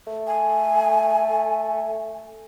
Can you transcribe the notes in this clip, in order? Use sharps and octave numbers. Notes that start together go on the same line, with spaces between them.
A3
G#5